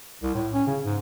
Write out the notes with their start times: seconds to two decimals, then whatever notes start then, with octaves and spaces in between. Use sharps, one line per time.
0.23 C2
0.35 A2
0.54 C#4
0.67 C#3
0.84 G#2